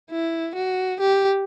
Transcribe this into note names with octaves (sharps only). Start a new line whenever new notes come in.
E4
F#4
G4